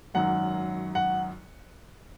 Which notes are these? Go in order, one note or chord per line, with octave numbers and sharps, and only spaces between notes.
G#1 F#2 D#3 F#3 F#5
F#5